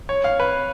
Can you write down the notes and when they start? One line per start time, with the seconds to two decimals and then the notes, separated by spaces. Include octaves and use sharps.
0.09 C#5
0.24 F5
0.40 B4